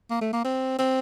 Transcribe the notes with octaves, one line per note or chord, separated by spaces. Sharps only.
A#3
A3
A#3
C4
C4